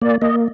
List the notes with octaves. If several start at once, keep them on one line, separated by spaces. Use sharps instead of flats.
A#3 D5
A#3 D#5